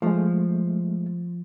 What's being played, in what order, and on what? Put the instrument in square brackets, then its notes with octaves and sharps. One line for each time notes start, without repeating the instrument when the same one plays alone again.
[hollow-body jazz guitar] F3 [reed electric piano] G#3 A3